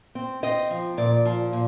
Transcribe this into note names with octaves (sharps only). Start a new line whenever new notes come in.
C4
C4 D#5
F3
A#2 D5
F3
A#2